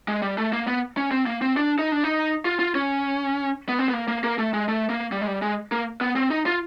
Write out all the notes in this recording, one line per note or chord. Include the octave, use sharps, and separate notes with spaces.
G#3
G3
A3
A#3
B3
C#4
C4
A#3
C4
D4
D#4
D4
D#4
F4
F4
C#4
B3
C4
B3
A#3
A#3
A#3
A3
G#3
A3
A#3
G3
G#3
G3
G#3
A#3
B3
C4
D#4
F4